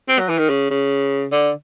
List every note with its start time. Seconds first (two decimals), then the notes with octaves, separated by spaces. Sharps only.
0.09 C4
0.19 F#3
0.29 E3
0.39 D#3
0.50 C#3
0.70 C#3
1.32 D3